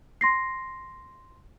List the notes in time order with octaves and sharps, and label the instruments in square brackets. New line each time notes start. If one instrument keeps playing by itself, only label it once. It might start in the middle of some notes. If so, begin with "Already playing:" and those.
[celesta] C6 A#6 C7